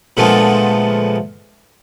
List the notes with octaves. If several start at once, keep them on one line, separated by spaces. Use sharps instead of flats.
A#2 D3 F3 G#3 A3 B3